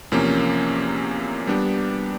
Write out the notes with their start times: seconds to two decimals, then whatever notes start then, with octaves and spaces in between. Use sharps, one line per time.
0.12 E2 C3 F3 A#3 C#4
1.47 G3 B3 D4 G4